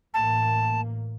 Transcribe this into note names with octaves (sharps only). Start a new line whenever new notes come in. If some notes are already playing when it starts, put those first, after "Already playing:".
A1 A2 A#3 A5